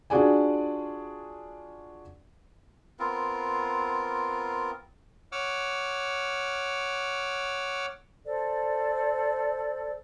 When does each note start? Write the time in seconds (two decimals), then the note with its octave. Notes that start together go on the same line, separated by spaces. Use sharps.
0.10 D4 F4 F#4 G#4 D5 G#5
2.99 B3 C4 F4 A#4
5.32 C#5 F#5 D6 E6 F6
8.24 A4 C5 D5